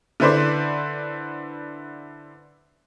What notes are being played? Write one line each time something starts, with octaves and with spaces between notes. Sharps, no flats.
D3 E4 B4 C5 D5